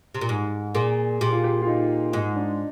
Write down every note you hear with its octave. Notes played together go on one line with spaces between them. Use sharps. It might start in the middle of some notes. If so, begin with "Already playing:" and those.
C3
A#2
G#2
A#2 G#4
A#2 G4
F4
G4
F4
D#4
G#2 D#4
D4